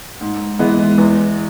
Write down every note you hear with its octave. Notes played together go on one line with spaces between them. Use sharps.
G#2
E3 G#3 B3
E2